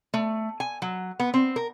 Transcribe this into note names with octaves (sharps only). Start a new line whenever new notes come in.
A3
G#5
F#3
B3
C4
A#4